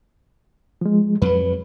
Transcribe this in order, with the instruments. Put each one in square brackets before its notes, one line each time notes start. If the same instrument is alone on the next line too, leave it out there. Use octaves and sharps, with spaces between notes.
[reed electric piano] F3 G#3
[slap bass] F2 F#3 [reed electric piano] B4